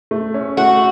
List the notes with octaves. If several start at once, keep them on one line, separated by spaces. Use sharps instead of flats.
A3
C#4
A3 F#4